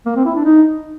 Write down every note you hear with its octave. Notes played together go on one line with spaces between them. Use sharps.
A#3
C4
E4
D4
D#4